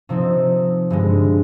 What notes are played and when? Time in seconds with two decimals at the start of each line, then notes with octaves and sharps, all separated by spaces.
0.09 C3 F3 C4 D#4
0.90 G2 D3 G#3